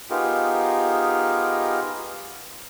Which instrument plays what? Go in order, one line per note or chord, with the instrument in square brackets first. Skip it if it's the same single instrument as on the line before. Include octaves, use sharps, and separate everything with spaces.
[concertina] B3 D#4 F4 G4 G#4 A#4